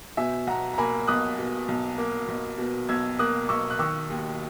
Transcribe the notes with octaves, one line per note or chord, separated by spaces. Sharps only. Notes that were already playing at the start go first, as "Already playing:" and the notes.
B2 E5 G#5
B1 F#5 A#5
A#5
A#3 G#5 B5
B1 D#6 F#6
B2
B1
A#3
B1
B2
B1 E6 G#6
A#3 D#6 F#6
B1 C#6 E6
F#6
D#3 C#6 E6
D#2